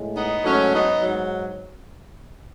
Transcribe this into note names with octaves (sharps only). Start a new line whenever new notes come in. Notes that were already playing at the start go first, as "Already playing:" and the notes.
Already playing: A2 G#3
B3 D#4
G#2 F#3 A3 C#4
B3 D#4
G#2 F#3